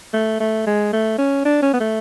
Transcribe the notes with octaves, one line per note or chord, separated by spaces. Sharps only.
A3
A3
G#3
A3
C#4
D4
C#4
B3
A3